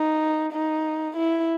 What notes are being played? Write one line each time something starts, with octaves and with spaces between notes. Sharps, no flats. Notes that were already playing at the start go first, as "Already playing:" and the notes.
Already playing: D#4
D#4
E4